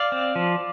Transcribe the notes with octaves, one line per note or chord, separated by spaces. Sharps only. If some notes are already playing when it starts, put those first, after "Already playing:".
Already playing: D5 F5
C4
F3